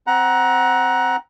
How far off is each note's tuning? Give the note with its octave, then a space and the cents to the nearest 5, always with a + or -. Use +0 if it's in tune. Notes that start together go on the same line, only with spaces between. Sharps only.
C4 +0 F#5 +5 A#5 +25